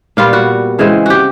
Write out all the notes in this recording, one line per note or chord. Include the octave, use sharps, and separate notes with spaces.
A#2 G3 B3 F4
F#4
C#3 E3 G#3 C4
F#4 G4